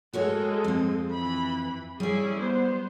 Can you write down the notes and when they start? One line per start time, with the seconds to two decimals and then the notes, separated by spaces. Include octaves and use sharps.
0.13 G#3 F#4 A4 A#4 C#5
0.64 F2 C4
1.13 E3 B5
2.00 G3 C#4 E4 G#4 D5
2.39 B3 C5